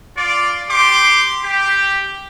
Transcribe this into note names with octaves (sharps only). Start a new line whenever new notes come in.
F4 D5
G4 C6 D6
G4